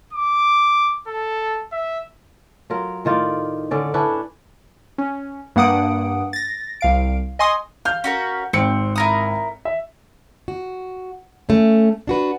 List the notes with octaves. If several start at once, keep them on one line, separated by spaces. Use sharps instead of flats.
D6
A4
E5
F#3 F4 A#4
A2 D#3 F4 D5
D3 C#4 D5
C#4 D4 E4 B4
C#4
G2 A#3 F#5 D#6 D7
A6 A#6
C2 F5 D7
D#5 G#5 C6 C#6 D#6
F5 F6 G6
C#4 F#4 A#4
G#1 C4 C#7
E4 A#4 D#6
E5
F#4
A3 C#4
D4 F#4 B4